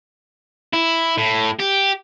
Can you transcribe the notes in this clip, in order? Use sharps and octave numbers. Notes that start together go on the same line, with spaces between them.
E4
A2
G4